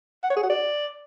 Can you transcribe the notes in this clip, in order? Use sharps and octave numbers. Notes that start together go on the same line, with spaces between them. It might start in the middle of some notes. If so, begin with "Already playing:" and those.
F#5
C#5
G#4
F#4
D5